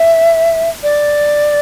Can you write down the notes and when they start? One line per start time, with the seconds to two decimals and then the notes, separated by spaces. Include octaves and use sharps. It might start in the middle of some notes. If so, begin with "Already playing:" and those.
Already playing: E5
0.83 D5